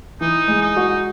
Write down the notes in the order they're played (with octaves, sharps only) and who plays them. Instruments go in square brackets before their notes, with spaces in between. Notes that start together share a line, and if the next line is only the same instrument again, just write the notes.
[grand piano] E3 [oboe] D#4
[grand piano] G#3
[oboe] D#4
[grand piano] F#4